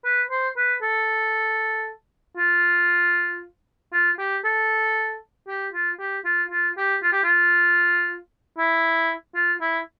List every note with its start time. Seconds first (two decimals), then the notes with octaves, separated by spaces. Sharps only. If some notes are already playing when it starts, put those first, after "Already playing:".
0.05 B4
0.31 C5
0.57 B4
0.82 A4
2.37 F4
3.93 F4
4.19 G4
4.44 A4
5.48 G4
5.73 F4
6.00 G4
6.25 F4
6.51 F4
6.77 G4
7.03 F4
7.13 G4
7.24 F4
8.58 E4
9.35 F4
9.61 E4